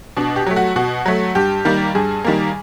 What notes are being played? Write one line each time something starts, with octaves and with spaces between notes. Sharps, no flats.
B2 D4
G4
F#3 A3
F#4
B2 F#4
F#3 A3
G2 G4
D#3 G3 A#3
G2 G#4
D#3 G3 A#3